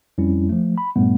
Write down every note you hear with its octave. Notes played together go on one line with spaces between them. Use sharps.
F2 G3 C#4 E4
F3 A3
B5
G2 A#2 G3 A3 B3